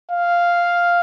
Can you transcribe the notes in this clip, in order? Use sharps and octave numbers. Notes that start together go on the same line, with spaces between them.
F5